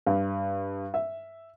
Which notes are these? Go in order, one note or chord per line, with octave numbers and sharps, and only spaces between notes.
G2
E5